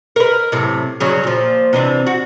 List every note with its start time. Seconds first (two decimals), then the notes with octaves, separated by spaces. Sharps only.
0.16 A#4 B4
0.52 F#2 A2 C3
1.00 G2 C#3 F#3
1.24 A#2 F3
1.73 C3 E3 D4
2.07 F#4